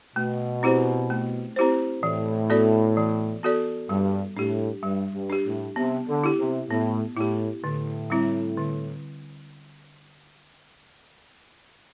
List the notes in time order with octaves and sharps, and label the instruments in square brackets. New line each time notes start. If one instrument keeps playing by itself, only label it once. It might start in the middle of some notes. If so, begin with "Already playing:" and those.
[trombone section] B2 [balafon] A3
[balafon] C4 E4 G4 C5
A3
C4 E4 G4 C5
[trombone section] A2 [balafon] E3
[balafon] B3 F#4 A4 D5
E3
B3 F#4 A4 D5
[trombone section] G2 [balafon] G3
[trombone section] A2 [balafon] D4 G4
[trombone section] G2 [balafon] G3
[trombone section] G2
[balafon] D4 G4
[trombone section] A2
[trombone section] C3 [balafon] B3
[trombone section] D3
[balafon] E4 G4
[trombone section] C3
[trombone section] A2 [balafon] B3
[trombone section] A2 [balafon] E4 G4
[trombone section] A2 [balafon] D3
[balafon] G3 C4 E4
D3